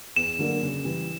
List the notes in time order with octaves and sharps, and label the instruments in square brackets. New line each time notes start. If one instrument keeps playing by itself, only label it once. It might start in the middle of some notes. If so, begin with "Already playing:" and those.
[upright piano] E2 [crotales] E7
[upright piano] D3 F#3 A#3 D4
C#3
E3 G3